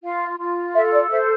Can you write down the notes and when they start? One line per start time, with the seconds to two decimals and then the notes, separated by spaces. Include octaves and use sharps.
0.03 F4 F5
0.39 F4
0.74 A4 E5
0.93 D5
1.11 C5 E5